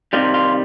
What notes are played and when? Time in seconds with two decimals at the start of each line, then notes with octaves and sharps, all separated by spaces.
0.13 C3 D#3 G3 F4
0.34 F4